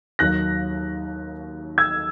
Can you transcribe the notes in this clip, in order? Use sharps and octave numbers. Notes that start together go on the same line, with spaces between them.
D#2 D#3 F#3 F#6 A#6
E6 G#6